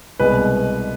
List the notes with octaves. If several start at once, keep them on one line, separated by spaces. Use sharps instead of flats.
C2 B2 G#3 B4